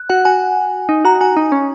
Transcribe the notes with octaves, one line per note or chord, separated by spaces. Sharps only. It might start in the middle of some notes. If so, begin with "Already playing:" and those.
Already playing: F#6
F#4 F#5
F#4 G#5
D#4
F#4 A#5
F#4 G#5
D#4
C#4